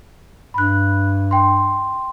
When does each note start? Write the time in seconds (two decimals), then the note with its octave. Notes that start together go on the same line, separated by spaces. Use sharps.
0.54 G2 B5 F#6
1.31 G5 C6